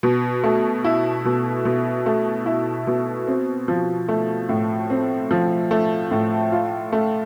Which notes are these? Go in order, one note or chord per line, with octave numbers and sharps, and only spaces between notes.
B2
A3
E4
B2
B2
A3
E4
B2
C4
F3
A3
A2
C4
F3
A3
A2
F4
A3